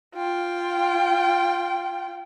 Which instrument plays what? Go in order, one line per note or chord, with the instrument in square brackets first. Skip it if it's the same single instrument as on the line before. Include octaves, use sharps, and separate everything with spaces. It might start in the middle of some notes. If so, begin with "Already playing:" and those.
[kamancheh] F4 G5